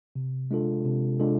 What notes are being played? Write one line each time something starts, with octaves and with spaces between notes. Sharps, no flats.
C3
G#3 D4 F4 A4
C3
G#3 D4 F4 A4